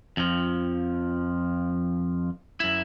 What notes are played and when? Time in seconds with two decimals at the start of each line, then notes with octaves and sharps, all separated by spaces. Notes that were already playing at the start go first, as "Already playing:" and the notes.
0.17 F2 F3
2.60 F#2 E4